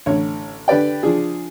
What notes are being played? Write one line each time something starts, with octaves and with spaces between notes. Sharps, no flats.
A1 D3 C#5
D3 G4 B4 D5 G5
F3 D4 G#4